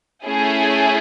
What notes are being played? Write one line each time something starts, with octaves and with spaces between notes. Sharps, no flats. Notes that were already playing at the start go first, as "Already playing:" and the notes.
A3 C#4 E4 G#4